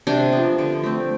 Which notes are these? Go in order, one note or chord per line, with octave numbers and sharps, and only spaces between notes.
C3 D4
F3 B3
D3
A3 C4